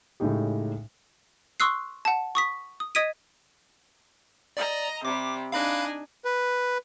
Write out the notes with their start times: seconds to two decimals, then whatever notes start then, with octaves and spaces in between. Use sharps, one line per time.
0.20 A2 C#3 G#3 C#4 D#4 G4
1.60 C6 C#6 D#6 E6 F#6 C7
2.05 F#5 A5
2.35 C#6 D#6 B6
2.80 D#6
2.95 D#5 D#6 G#6 B6 D7 D#7
4.57 D5 D#5 A#5
5.05 C3 G3 D6
5.52 D4 D#4 F5 G#5 B5 F#6
6.25 B4